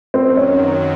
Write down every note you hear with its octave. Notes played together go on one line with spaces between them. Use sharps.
F#2 D#3 F#3 C4
C#4